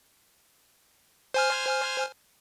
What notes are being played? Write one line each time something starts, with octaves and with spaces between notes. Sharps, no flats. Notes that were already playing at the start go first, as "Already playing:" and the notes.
C5 G#5 F6